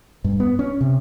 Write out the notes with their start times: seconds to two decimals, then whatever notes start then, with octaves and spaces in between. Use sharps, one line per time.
0.24 G2
0.40 B3
0.59 C#4
0.81 C3